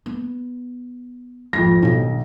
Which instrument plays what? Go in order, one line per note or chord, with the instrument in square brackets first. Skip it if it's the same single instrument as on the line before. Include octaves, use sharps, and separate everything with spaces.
[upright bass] B3
[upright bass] G#1 [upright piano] F2 A#6
[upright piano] B1 [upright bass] G2 D#3